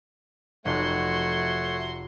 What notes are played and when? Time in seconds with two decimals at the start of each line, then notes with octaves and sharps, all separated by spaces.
0.65 F1 A3 F#4 C#5 F#5 C6